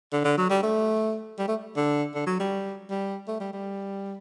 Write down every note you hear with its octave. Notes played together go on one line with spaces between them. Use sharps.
D3
D3
F#3
G3
A3
G3
A3
D3
D3
F#3
G3
G3
A3
G3
G3